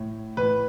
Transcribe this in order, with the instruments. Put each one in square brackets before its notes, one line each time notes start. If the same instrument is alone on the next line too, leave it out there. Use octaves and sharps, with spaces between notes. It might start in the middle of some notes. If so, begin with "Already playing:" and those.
Already playing: [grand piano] A2
A2 B4